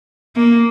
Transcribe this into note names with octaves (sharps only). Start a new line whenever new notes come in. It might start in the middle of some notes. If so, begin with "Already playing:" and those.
A#3